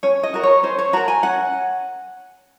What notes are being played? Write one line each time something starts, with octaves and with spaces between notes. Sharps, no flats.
C#4 C#5
D#5
F#4 A#4
C#5
C#4 C5
C#5
F#4 A#4 A#5
G#5
C#4 F#5